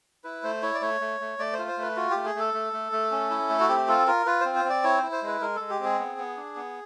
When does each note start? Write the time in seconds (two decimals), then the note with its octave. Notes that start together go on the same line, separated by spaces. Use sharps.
0.24 E4 B4
0.43 A3 C5
0.62 E4 C#5
0.74 D5
0.81 A3 C#5
1.01 A3
1.20 A3
1.39 A3 D5
1.53 C5
1.58 F4
1.68 C5
1.77 A3 B4
1.96 F4 F#4
2.11 A3 G4
2.25 G#4
2.35 A3 A4
2.54 A3
2.73 A3
2.92 A3
3.11 C#4
3.30 E4
3.50 A3
3.60 F#4
3.68 C4 G4
3.88 F4 A4
4.07 F4 A#4
4.26 F4 B4
4.41 C4 C5
4.55 C5
4.64 C4
4.70 D5
4.84 E4 C#5
4.98 E4 C5
5.12 C5
5.22 G#3 B4
5.41 G#3 A#4
5.56 G#3 A4
5.70 G4
5.79 C4
5.84 G#4
5.99 B3
6.18 B3
6.37 D4
6.56 B3